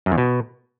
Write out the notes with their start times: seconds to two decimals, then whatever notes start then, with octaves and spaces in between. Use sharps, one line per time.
0.06 F#2
0.12 E2
0.18 B2